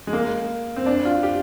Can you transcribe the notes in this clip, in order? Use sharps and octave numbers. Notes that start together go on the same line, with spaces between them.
G#3
A#3
C4
D4
F4
G4